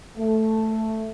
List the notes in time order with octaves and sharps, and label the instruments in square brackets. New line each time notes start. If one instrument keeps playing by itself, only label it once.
[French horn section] A3